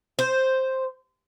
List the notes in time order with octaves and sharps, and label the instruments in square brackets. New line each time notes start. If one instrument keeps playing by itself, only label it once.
[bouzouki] C5